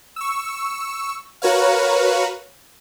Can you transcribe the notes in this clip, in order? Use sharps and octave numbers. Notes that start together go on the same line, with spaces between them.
C#6 E6
F#4 A#4 B4 C#5 F5